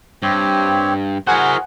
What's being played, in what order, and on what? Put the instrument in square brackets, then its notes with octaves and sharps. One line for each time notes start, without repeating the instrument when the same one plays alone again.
[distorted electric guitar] G2 [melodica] C4 G4 C#5
[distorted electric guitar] E4 C5 [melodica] F#4 G#4 A#4 [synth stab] F#5 G#5